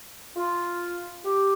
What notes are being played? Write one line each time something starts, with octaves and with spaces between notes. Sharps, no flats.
F4
G4